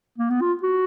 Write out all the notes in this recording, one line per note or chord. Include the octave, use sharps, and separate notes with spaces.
A#3
B3
F4
F#4